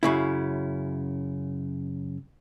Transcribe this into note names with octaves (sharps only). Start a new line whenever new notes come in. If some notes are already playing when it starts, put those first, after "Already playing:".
F#2 C#3 E4